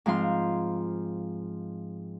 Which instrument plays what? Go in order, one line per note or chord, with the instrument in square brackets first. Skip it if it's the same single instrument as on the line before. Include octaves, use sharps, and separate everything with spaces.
[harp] G#2 F3 C4 F5 C6